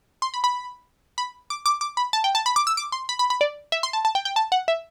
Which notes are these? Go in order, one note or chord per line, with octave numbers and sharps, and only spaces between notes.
C6
B5
B5
B5
D6
D6
D6
B5
A5
G5
A5
B5
D6
E6
D6
C6
B5
B5
B5
D5
E5
C6
A5
A5
G5
G5
A5
F#5
E5